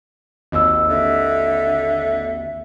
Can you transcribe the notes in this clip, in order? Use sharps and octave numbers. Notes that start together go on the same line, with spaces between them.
G#1 D#2 D#5 E6
D3 E5